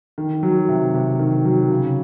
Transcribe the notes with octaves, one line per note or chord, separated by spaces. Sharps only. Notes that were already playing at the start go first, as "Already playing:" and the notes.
D#3
F#3
C3
C3
D#3
F#3
C#3